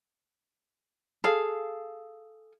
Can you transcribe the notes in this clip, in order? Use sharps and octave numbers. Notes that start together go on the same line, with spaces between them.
G#4 A4 F5